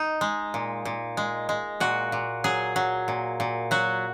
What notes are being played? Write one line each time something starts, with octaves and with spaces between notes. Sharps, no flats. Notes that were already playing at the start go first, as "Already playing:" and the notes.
Already playing: D#4
G#3
A#2
A#2
G#3
G#3
A#2 F#4
A#2
F#3 G#4
F#3
A#2
A#2
F#3 F#4